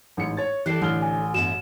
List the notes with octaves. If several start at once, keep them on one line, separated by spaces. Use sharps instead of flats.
A1 G#2 C#7
C#5 A6
E3 G3 E4 G4 A4 F#6 C7
A1 D3 F6 G7
G#5
G2 B3 F#4 E5 E7